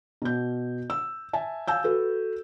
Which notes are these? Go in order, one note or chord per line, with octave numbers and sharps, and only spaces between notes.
B2 G6
E6
E5 G#5 A5
F5 G#5 A5 E6 G6
F#4 A4 B4